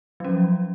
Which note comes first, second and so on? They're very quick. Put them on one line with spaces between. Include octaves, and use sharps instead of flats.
F#3 C#4 F3